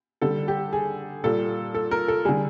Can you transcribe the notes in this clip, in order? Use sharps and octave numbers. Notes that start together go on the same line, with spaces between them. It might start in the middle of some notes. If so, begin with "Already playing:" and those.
D3 G3 A4
G4
G#4
A#2 G3 A4
A4
A#4
A4
D3 G3 G#4